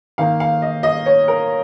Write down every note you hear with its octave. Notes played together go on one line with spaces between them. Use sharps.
D#3 A#3 F5
F5
D#5
D#5
C#5
A#4